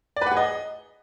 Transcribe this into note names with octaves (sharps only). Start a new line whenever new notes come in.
D5
B4
F#5
G#4
D#5